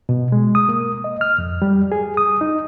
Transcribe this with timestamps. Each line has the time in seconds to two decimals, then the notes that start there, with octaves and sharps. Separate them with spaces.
0.09 B2
0.32 G#3
0.55 D#6
0.69 A#3
1.04 D#5
1.21 F6
1.38 F2
1.62 G3
1.92 G#4
2.17 D#6
2.41 D#4